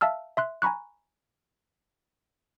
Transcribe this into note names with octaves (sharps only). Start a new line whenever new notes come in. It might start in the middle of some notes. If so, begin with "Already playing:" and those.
E5 F5 A5 E6 F6
E5 C6 F#6
G#5 A#5 B5 C#6 F#6